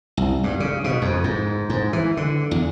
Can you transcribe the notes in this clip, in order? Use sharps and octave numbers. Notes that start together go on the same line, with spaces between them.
C2
G2
C#3
B2
F2
G#2
G#2
E3
D3
E2